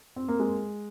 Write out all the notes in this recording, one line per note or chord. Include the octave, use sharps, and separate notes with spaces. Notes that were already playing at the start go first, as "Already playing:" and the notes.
C4
A#3
G#3